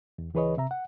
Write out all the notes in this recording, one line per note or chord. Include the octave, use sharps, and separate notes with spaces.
E2
C#2 E3 G#4 B4 C#5 D#5
C3 E5 A#5
F#5